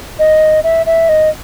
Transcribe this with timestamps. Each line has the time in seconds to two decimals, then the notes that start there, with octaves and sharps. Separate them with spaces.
0.19 D#5
0.64 E5
0.86 E5
1.09 D#5